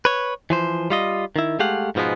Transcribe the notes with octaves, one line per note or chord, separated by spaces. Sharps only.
B4 C#5
E3 F3 C5
G3 F4 D#5
D#3 E4
G#3 A3 G4 F5 F#5
G#2 B2 F3 G#3 B3